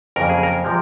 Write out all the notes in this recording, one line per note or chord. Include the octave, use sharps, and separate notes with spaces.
F2 C#3 F#3 A#3 A#4
G#4
A#4
C3 F3 G#3 C4